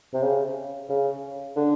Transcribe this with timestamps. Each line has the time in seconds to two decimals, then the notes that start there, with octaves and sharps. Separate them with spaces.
0.14 C3
0.23 C#3
0.90 C#3
1.56 D3